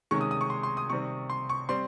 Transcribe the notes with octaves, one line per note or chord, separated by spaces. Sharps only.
C3 D#3 G#3 C#4 C#6
D#6
D#6
C#6
C6
C6
D#6
C3 D#3 G3 C4 C#6
C6
C#6
G3 C4 C6